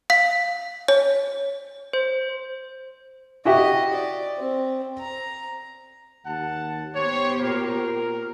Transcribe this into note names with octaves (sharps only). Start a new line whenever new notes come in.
F5 B6
C#5
C5
E4 F#4 G4 D#5
D5
C4
A#5
D#2 F#5 A5
B3 G4 C5 C#5
A#2 A#4